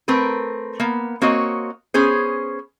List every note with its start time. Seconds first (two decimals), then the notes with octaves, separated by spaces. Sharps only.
0.08 A3 C4 A#4 B4
0.80 A#3 B3
1.22 A#3 C4 F#4 C#5 D#5
1.94 B3 C#4 G#4 C5